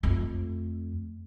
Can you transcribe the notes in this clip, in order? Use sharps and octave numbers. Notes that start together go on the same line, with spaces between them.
F2 A3